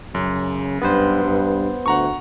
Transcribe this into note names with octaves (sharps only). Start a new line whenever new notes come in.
F#2 C#3
G2 B3 B4 C5
G2
D2 F#5 A#5 C#6